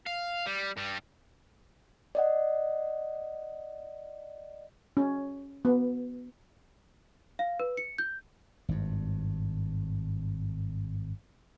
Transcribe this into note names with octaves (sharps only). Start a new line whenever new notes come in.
F5
G3
G2 G3
D5 D#5 F#5
C#4
B3
F5
B4
C#7
G6
G#1 G2